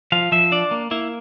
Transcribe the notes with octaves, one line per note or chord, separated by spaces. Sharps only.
F3 F5
F3 E5
D4 D5
A#3
A#3 E4